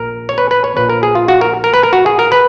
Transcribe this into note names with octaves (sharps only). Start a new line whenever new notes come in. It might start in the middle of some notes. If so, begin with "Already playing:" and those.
Already playing: A#1 A#2 A#4
C#5
B4
B4
C#5
A#1 A#2 F3 B4
A#4
G#4
F4
F#4
A#4
A#4
B4
A#4
F#4
G#4
A#4
B4